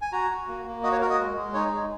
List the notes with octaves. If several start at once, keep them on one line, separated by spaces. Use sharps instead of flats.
G#5
F#4 A#5
F#4
A#3
A#3
F#4 D#5
C#5
F#4 A#4
D#5
G#3
G#3
D#4 C#5
G#3